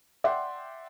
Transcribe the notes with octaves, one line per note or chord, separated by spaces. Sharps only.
D5 E5 F#5 G5 C6